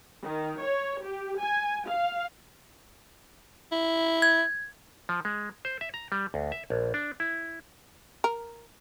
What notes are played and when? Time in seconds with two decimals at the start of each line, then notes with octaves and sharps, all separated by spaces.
0.23 D#3
0.62 C#5
1.06 G4
1.41 G#5
1.90 F5
3.72 E4
4.22 G#6
5.09 F3
5.25 G#3
5.65 C5
5.81 E5
5.94 A#5
6.12 G3
6.34 D2
6.52 E5
6.70 A#1
6.94 D4
7.20 E4
8.24 A#4